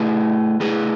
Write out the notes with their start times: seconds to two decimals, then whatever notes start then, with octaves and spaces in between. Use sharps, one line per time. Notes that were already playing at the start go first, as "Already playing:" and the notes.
Already playing: A3 E4 G#4 B4
0.60 A3 E4 G#4 B4